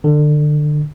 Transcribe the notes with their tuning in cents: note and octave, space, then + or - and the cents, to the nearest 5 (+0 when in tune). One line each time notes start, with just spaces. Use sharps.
D3 +25